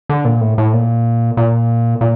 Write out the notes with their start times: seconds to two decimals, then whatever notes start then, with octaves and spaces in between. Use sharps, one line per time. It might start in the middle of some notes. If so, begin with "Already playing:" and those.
0.09 D3
0.25 A#2
0.41 A2
0.58 A2
0.73 A#2
1.37 A#2
2.01 A#2